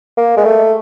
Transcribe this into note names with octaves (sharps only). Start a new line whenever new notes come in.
A#3
G#3
A3